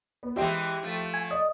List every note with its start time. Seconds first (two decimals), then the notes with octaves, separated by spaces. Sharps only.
0.23 B3
0.36 E3 G#3 C4 G4 E5 G5
0.83 F3 A3
1.14 G#5
1.31 D5 D#5